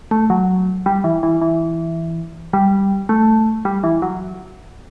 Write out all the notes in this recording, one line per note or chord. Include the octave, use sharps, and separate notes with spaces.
A3
F#3
G3
E3
E3
E3
G3
A3
G3
E3
F#3